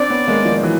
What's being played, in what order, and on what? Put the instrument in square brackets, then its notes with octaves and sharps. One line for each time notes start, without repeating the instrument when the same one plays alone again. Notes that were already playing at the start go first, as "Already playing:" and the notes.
Already playing: [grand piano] C4 D4 [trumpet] D5
[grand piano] B3 C#4
G#3 A#3
D#3 F3
E3 F#3